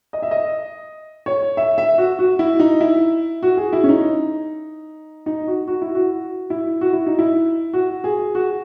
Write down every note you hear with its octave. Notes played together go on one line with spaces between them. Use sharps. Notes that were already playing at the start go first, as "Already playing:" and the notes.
D#5
E5
D#5
C#5
E5
E5
F#4
F#4
E4
D#4
E4
F#4
G#4
E4
C#4
D#4
D#4
F#4
F#4
E4
F#4
E4
F#4
E4
D#4
E4
F#4
G#4
F#4